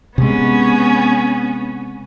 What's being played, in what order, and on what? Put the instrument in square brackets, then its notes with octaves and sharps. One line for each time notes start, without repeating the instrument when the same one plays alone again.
[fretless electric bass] C3 G#3 [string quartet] B3 C#4